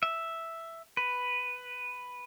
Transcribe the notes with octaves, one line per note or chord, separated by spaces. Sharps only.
E5
B4